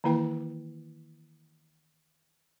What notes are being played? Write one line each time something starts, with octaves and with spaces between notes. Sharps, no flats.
D#3 E3 A#3 E4 B4 G5